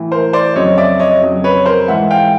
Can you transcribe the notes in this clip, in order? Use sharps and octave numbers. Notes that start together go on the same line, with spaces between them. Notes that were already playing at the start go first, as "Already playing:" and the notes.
Already playing: A2 E3
A#4 C5
C5 D5
F2 C#3 F#3 C#5 D#5
D5 E5
C#5 D#5
F2 C#3 F#3
B4 C#5
A#4 C5
G#2 E3 E5 F#5
F5 G5